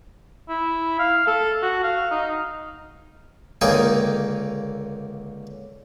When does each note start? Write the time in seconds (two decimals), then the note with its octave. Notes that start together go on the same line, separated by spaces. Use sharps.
0.49 E4
0.99 F5
1.27 A4
1.63 F#4
1.83 F5
2.11 D#4
3.61 C#2 D3 A#3 G#4 G5 G#5